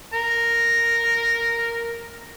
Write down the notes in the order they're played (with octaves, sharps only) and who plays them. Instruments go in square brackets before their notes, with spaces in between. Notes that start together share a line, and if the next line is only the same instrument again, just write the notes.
[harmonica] A#4 A#5